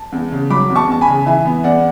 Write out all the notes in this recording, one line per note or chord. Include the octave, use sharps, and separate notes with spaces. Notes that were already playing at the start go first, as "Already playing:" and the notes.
Already playing: A5
E2
C#3
F#3 B5 D6
E2
A5 C#6
E2 A5
G#5 B5
C#3
E3 E5 G#5
B3
E2 D5 F#5